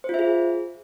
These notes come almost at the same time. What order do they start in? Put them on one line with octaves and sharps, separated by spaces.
C5 F4 E5 G#4